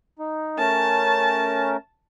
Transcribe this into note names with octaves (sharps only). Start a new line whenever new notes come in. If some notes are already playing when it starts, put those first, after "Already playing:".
D#4
A3 C#4 A#4 A5